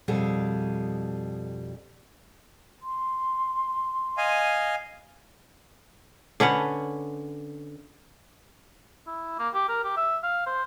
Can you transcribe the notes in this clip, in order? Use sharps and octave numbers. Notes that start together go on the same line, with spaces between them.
F2 B2 G3 G#4 A4
C6
D#5 F5 G#5
D3 C#4 B4 F#5
E4
A#3
G4
A#4
G4
E5
F5
C5